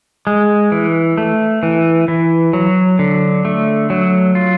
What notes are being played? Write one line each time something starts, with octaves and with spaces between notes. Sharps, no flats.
G#3
E3
A3
E3
E3
F#3
D3
A3
F#3
F4